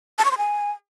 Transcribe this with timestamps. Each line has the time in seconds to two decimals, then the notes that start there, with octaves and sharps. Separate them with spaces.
0.19 A5
0.25 C#6
0.31 C6
0.38 G#5